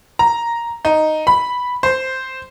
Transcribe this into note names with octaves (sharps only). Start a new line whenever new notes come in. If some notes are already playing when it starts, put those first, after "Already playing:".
A#5
D#4
B5
C5